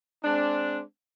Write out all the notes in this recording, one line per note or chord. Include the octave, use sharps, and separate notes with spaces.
G#3 C4 D4